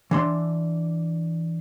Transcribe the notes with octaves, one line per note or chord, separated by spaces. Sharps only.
E3 D4 C6